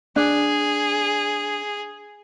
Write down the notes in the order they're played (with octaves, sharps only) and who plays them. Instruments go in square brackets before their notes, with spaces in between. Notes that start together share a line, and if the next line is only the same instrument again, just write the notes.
[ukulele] D4 [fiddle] G#4